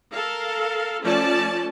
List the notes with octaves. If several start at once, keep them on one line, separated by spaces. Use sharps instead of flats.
A4 A#4 F5
F3 A3 C#4 F4 D5 A5